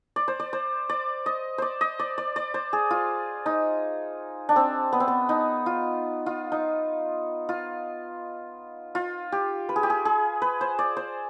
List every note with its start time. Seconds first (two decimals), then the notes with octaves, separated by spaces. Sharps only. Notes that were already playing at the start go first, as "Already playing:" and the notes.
0.16 D5
0.28 C5
0.40 D5
0.53 C5
0.89 D5
1.26 D#5
1.58 C5 D5
1.81 D#5
1.99 D5
2.18 D5
2.36 D5
2.54 C5
2.73 G#4
2.91 F4
3.46 D#4
4.49 D4
4.56 C4
4.93 B3
5.00 C4
5.08 B3
5.29 D#4
5.66 F4
6.26 F4
6.52 D#4
7.49 F4
8.95 F4
9.32 G4
9.69 B4
9.76 G#4
9.83 G4
9.90 G#4
10.05 G#4
10.42 B4
10.61 C5
10.79 D5
10.97 C5